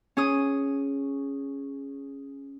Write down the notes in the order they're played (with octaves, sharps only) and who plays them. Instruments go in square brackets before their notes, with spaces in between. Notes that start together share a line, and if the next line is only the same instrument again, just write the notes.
[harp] C#4 G#4 D#6